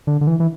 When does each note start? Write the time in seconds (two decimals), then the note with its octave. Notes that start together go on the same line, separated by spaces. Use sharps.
0.07 D3
0.21 D3
0.27 E3
0.40 E3